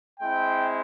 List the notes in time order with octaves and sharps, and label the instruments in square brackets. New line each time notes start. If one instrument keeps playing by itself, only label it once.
[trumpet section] G#3 C4 E4 G5